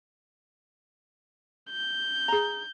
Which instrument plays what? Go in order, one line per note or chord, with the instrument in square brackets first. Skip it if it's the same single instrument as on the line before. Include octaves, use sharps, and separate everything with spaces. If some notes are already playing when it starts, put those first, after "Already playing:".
[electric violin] G6
[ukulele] G#4 A#5